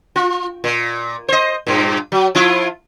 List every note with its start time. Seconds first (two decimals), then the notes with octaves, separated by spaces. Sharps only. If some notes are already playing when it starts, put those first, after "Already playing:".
0.16 F4
0.64 A#2
1.28 C5 D#5
1.67 G2 A#2
2.12 F#3
2.35 F3 E4 F4